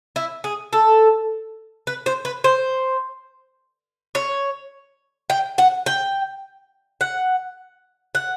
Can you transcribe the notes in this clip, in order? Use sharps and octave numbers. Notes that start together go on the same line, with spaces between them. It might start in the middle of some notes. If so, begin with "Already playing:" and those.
E4
G#4
A4
B4
C5
B4
C5
C#5
G5
F#5
G5
F#5
F#5